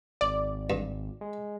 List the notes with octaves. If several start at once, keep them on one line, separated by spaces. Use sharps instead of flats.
G#1 D5
G2
G#3